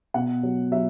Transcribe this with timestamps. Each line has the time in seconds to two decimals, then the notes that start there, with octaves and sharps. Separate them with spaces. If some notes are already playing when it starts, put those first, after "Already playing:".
0.14 B2 F#5
0.43 F#3
0.72 F#3 E5